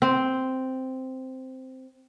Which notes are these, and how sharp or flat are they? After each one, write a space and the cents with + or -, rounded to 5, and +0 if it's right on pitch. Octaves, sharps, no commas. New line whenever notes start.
C4 -5